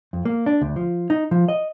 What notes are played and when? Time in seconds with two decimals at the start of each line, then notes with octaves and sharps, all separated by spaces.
0.13 F2
0.25 A#3
0.46 D4
0.62 D2
0.76 F3
1.10 D#4
1.31 F3
1.49 D#5